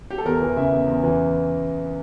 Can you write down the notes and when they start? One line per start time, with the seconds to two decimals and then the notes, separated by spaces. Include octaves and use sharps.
0.10 G4
0.18 A4
0.25 E2 A#4
0.41 E3
0.56 C#3 E5
0.72 E2
0.87 E2
1.03 E3